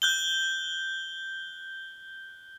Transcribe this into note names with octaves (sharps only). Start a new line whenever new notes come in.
F#6 G6 G7